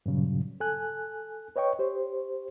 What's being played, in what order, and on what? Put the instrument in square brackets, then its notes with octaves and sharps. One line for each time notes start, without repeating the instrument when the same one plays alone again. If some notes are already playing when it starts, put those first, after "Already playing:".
[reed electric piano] G2 A#2 C#3 F#3
A4 G#5 F#6
B4 C#5 D#5 G5 C#6
G4 C5